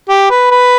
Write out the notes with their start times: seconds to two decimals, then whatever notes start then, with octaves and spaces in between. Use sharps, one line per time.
0.09 G4
0.30 B4
0.51 B4